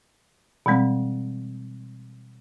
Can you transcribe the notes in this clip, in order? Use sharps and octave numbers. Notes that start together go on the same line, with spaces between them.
B2 E3 G3 G#3 C4